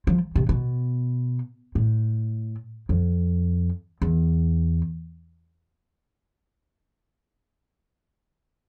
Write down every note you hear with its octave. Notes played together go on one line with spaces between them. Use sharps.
F3
C3
B2
A2
F2
E2